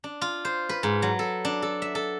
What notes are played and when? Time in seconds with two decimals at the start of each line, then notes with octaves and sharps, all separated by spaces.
0.04 D4
0.21 F4
0.45 C5
0.69 B4
0.83 G#2
1.02 F#3
1.19 A4
1.45 D4
1.62 A4
1.82 E5
1.95 A4